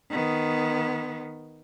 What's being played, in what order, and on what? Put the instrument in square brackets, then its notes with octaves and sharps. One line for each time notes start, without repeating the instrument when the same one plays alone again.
[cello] D#3 B3